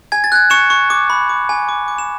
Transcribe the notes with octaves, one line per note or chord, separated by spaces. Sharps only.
G#5 G#6
A6
F#6 G#6
C#6 C#7 E7
C#6
D6
B5
D6
G#5
D6
D6
E7